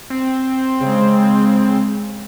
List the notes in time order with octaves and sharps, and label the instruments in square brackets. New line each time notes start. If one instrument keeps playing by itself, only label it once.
[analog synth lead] C4
[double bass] C#3 G#3